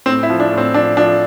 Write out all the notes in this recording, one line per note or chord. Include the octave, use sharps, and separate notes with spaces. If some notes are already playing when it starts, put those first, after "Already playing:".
A2 C4
E4
F3
D4
A2
C4
F3 D4
F3 D4